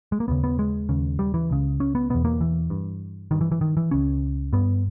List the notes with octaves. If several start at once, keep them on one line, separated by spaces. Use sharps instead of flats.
G#3
A#3
D#2 C#3 B3
B3
G#3
D#2 C#3
G3
E3
C#2 C#3
C#4
B3
E2 B2 B3
A#3
E3
G2
G2 D#3
E3
E3
D#3
E3
C#2 C#3 C#4
G2 B3